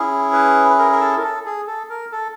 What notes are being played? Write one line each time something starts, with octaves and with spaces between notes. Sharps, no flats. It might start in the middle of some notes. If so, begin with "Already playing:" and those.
Already playing: C#4 E4 G#4
B4
B4
A#4
A#4
A4
A#4
A4
G#4
A4
A#4
A4